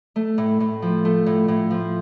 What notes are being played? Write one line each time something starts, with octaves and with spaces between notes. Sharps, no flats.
A3
A2
A2
F3
A3
A2
A2
F3